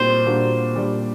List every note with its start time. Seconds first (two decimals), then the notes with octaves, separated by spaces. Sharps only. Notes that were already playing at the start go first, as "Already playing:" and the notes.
Already playing: A#2 G3 C4 D#4 F#4 C5
0.26 A#2 G3 A#3 D4 F#4
0.76 A#2 G3 D4